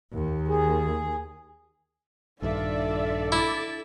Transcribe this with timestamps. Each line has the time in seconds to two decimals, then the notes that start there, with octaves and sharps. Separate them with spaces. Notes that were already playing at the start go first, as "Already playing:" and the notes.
0.13 D#2
0.48 G#4
2.42 A#1 G2 D#3 D4 F4 A4 D5 E5
3.32 E4 D6 A6